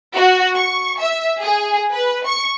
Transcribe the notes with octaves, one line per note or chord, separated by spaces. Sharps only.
F#4
C#6
E5
G#4
B4
C#6